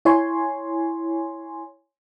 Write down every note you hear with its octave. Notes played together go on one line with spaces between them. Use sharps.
E4 C#5 G#5 C6